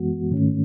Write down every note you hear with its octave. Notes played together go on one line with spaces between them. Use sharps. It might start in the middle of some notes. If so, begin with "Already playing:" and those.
Already playing: F#2 E3 G#3 B3 F#4
G#2 D#3 A3 C#4